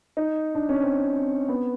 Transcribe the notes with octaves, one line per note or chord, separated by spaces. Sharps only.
D#4
D4
C#4
C4
B3